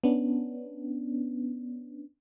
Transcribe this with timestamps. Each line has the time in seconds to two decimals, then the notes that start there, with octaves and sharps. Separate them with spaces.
0.04 B3 C#4 D4